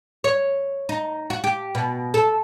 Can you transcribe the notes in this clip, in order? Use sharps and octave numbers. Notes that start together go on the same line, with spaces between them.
C#5
D#4
F#4
G4
B2
A4